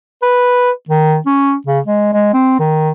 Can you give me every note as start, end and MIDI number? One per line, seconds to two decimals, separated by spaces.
0.22 0.71 71
0.89 1.17 51
1.26 1.54 61
1.67 1.79 49
1.86 2.12 56
2.13 2.32 56
2.34 2.58 60
2.59 2.91 51